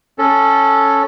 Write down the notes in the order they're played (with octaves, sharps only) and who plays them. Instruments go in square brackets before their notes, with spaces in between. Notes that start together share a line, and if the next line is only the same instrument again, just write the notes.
[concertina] C#4 A4